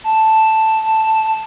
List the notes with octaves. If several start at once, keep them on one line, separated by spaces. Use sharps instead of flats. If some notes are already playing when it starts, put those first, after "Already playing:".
A5